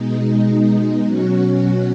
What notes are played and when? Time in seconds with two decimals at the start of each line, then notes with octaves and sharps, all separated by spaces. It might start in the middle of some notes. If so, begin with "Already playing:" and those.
Already playing: B2 G#3 D#4
1.04 B2 F#3 C#4 F#4